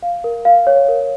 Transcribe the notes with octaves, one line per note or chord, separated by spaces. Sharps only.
F5
A#4
F5
C#5
A#4